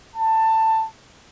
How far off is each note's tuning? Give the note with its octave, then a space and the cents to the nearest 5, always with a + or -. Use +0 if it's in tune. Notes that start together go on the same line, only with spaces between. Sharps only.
A5 +15